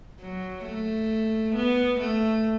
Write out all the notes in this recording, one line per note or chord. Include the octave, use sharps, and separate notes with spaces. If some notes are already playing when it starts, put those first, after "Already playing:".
F#3
A3
B3
A3